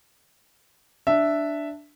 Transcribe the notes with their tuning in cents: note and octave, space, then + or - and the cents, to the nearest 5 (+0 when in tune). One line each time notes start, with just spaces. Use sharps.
D4 +0 E5 +0